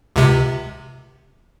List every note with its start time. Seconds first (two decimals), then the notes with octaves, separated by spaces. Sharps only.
0.16 C#2 C3